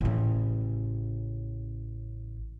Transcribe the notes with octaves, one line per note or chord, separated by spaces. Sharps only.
A1 C#3